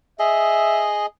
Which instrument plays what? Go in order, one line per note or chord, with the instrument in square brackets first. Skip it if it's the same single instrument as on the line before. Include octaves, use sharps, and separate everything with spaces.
[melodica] G#4 D#5 [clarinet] E5